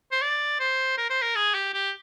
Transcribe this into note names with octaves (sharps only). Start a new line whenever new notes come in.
C5
D5
C5
A#4
C5
A#4
G#4
G4
G4